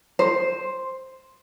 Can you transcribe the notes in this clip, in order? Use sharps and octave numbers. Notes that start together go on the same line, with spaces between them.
C5